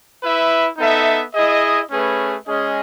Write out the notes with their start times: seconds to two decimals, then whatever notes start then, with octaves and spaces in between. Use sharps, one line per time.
0.22 E4 B4 E5
0.78 B3 D#4 A4 E5
1.34 E4 G#4 D#5
1.91 A3 C#4 G#4 B4
2.48 G#3 C#4 G#4 D#5